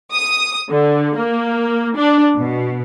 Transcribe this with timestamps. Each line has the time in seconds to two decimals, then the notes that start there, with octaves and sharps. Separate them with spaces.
0.13 D#6
0.70 D3
1.15 A#3
1.96 D4
2.37 B2